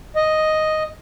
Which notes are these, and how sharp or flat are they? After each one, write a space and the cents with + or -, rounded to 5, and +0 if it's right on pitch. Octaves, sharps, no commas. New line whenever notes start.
D#5 +0